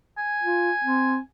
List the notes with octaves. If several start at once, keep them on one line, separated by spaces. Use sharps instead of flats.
G#5
F4
C4